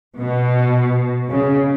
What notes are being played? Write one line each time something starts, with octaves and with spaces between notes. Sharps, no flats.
B2
C#3